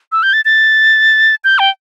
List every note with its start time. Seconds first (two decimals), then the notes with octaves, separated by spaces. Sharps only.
0.12 E6
0.23 G6
0.33 A6
0.45 A6
1.44 G6
1.59 G5